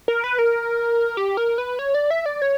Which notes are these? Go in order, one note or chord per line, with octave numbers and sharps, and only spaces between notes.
A#4
B4
A#4
G4
A#4
B4
C#5
D5
E5
D5
C#5